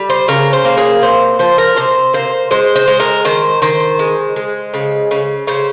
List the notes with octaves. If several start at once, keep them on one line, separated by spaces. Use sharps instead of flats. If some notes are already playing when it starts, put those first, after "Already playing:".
Already playing: G3
C5
C#3 A#4
C5
A#3
G#4
C3 C5
F3 C5
A#4
C3 C5
A#3 C5
G#3 C5
C5
G#3
A#4
D#3 C5
D#3 C5
G#3
G#3
C#3
C#3
C#3 C5